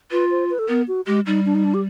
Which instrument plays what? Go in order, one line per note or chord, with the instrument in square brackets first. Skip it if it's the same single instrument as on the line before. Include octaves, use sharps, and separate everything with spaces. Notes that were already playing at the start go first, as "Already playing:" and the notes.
[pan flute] F4 [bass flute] B4
[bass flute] C5
B4
A4
[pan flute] B3 [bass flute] A#4
[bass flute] F#4
[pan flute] G#3 [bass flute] G4
[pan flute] G3 [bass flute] D#4
[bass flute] D4
D#4
D4
G4